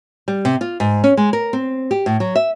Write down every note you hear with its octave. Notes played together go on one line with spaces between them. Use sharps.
G3
C3
F4
G#2
C#4
G#3
A#4
C4
G4
A2
F#3
E5